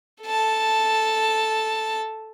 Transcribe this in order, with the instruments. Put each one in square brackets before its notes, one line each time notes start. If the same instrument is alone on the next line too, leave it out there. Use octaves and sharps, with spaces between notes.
[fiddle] A4 A5